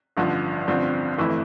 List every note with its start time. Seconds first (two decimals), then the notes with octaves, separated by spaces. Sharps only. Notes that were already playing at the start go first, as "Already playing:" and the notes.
0.17 A1 G2 D3 F3
0.67 A1 G2 D3 F3 C4
1.18 G1 F2 E3 A3 E4